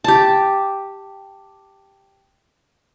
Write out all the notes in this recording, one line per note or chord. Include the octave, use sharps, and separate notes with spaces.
G4 A5